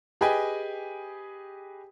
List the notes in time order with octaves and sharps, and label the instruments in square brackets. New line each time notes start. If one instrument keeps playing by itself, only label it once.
[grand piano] G4 G#4 B4 D#5 G5 G#5